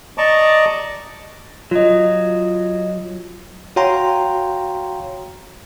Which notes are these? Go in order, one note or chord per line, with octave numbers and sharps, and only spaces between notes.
D5 D#5 A5 A#5 C#6 D6
F#3 F4 D#5
F#4 C#5 F5 G5 A#5 C6